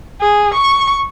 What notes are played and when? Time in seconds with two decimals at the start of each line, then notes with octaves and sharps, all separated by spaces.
0.21 G#4
0.54 C#6